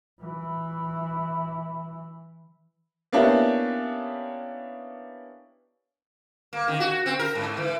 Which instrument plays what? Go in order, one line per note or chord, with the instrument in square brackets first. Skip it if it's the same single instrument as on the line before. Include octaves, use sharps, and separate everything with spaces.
[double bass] E3 E4
[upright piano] A#3 B3 C#4 D4 E4 G4
[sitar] A#3
D#3
F#4
C4
A#4
G#2
E3